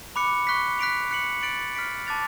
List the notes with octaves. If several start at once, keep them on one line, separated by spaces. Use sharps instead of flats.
B5 D6 F#6 C#7
C#6 F#6 B6
F#6 B6 D7 F7
F#6 C#7 F#7
F#6 A6 D7 F#7
F6 B6 D7
A5 D6 F#6 A6 F7